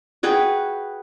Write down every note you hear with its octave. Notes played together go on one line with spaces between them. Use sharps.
F#4 G#4 B4 G5